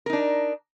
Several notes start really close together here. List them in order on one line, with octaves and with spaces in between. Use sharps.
A#4 D#4 D4